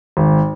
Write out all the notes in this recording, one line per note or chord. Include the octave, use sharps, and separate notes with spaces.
G#1